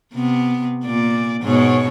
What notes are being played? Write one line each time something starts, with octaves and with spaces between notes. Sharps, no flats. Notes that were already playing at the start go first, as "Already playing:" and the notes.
C3 B3
A#2 D5
G#2 B2 C#5